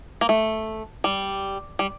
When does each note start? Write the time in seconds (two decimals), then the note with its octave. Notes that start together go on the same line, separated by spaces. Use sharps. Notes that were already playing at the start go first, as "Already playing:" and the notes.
0.21 A#3
0.29 A3
1.04 G3
1.79 G3